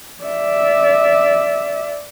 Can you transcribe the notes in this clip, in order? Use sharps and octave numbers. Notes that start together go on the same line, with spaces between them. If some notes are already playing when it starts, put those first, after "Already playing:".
D5 E5